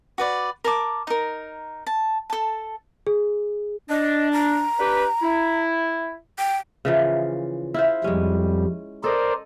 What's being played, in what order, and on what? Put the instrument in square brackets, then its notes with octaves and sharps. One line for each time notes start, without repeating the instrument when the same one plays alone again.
[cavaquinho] F#4 B4 D5
A#4 A5 D6
D#4 A#4
A5
A4 A5
[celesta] G#4
[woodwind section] D4 [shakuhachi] D#5
[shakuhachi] A#5
[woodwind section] D4 G4 B4
E4
[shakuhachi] G5
[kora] C#3 E3 F3
E4 F4 C5
[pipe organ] F2 G3 [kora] G#3 C#4
[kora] A4 D#5 [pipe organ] A#4 C5 D5